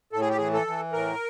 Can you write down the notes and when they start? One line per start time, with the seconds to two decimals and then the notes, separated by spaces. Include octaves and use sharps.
0.13 A2 A4
0.21 G#4
0.29 G4
0.37 E3 G#4
0.53 A4
0.67 E3
0.92 A2 A#4